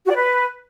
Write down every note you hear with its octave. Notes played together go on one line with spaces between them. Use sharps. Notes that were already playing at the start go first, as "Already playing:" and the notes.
F#4
D5
B4